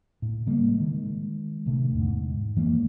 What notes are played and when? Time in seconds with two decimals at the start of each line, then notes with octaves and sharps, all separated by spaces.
0.22 A2
0.46 C#3 G3 G#3 A#3
0.77 D#3 G#3
1.66 D1 D2 C3 A3
1.95 E2 G#2
2.56 F2 E3 G#3 A#3